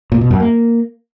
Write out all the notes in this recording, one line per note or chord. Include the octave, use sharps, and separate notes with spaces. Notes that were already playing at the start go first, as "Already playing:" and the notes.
A#2
B2
F#2
A#3